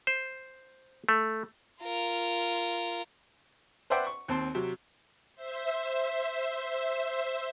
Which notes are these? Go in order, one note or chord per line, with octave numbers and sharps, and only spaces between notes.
C5
A3
F4 A#4
B4 C5 D5 E5 F#5 G5
C#6
D#2 C4 A5 C6
C3 F#3
C5 E5